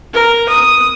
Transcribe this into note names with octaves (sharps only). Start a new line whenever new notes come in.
A#4
D#6